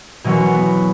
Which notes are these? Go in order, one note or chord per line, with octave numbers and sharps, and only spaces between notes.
B2 E3 F#3 C#4 F#4
B3